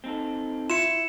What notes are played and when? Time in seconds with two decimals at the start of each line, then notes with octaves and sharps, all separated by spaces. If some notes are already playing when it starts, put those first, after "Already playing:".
0.04 C4 D#4 A4
0.70 E4 F4 C#7 E7